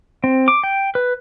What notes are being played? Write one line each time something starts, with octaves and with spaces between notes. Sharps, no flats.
C4
D6
G5
B4